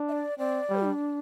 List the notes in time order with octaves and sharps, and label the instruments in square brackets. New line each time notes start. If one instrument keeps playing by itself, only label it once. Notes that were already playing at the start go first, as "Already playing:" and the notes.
Already playing: [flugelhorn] D4
[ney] E5
D5
[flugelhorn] C4 [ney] D5
[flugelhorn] G3
[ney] D4